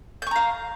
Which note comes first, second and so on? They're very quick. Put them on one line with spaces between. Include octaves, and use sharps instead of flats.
G6 C#6 A#5 F5